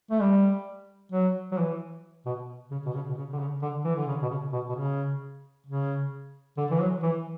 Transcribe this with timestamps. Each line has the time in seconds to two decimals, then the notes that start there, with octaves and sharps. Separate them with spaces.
0.11 A3
0.21 G3
1.12 F#3
1.52 F#3
1.58 E3
2.26 B2
2.71 C#3
2.86 B2
2.94 C#3
3.09 B2
3.17 C#3
3.32 D3
3.39 C#3
3.62 D3
3.84 E3
3.96 D3
4.07 C#3
4.22 B2
4.30 C#3
4.52 B2
4.69 B2
4.75 C#3
5.66 C#3
6.57 D3
6.71 E3
6.80 F#3
7.03 E3